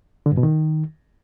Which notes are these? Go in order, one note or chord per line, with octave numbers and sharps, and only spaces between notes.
D3
G2
B2
D#3